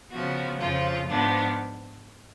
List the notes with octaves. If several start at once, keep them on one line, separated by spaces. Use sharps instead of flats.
C#3 F3 B3 F#4
F2 C#3 F3 F4
G#2 F3 B3 D4